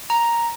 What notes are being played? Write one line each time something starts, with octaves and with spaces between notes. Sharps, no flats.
A#5